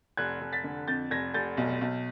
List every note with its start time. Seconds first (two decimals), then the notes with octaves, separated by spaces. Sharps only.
0.17 F1 F#6 G#6
0.41 F1
0.53 A6 B6
0.64 D3
0.87 F2 G6 A6
1.11 F1 G#6 A#6
1.34 F1 G6 A6
1.57 B1
1.81 B1